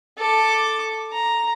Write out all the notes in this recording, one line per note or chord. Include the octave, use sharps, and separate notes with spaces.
A4 D6
A#5